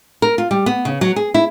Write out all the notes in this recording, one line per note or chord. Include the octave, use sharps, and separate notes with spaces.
A#4
F4
G3
B3
C#3
F#3
G#4
E4